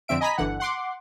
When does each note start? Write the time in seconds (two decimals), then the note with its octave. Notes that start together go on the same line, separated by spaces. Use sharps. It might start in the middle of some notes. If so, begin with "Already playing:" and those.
0.08 F2 D3 C4 E5 D7
0.21 D#5 G#5 A#5 B5 B6
0.38 G1 D3 E3 F#5
0.60 F#5 C6 D6